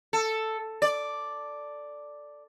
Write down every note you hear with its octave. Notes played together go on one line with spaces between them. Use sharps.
A4
D5